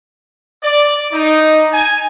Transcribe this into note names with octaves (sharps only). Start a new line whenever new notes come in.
D5
D#4
G#5